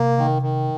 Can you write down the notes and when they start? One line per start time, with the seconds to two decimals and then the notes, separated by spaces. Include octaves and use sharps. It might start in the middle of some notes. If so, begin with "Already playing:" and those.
Already playing: C3 A#3
0.18 D#3
0.42 D#3